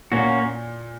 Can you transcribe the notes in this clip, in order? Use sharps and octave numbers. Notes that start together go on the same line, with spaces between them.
A#2 A#3 C#4 F#4